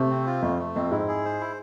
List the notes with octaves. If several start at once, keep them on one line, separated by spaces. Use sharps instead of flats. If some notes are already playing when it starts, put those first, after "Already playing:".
Already playing: C3 A3
C4
F4
F2 A3
A3
F2 C4
G#2 E4
G#4
C5
E4